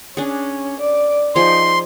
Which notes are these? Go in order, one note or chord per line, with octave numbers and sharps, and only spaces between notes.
C#4 D4 G#4
D5
F3 D#4 G#4 C6